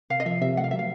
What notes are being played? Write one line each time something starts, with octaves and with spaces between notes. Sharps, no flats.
C3 F5
D#5
F3 E5
C3 E5
A3 F#5
F5
F#3 E5
F5